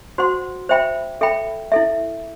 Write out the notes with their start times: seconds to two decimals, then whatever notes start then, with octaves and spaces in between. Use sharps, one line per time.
0.18 F#4 C5 F#5 C6
0.69 C5 E5 G5 B5
1.21 A4 E5 G5 B5
1.72 E4 A4 E5